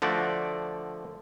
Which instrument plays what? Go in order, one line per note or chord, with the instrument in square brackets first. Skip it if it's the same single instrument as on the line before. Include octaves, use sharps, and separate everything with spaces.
[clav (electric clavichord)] D3 F3 A3 F#4 D5